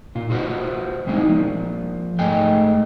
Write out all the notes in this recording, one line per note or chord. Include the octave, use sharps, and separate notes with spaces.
A#2 F4
F4 F#4 B4 C5 F#5
G3 G#3 B3 C4 D#4 E4
F3 A#3
G#2 A3 G#4 D#5 G5 G#5